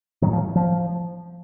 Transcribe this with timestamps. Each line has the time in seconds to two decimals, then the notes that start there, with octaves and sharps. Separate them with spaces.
0.22 A2 D#3 F#3
0.33 F3
0.56 F3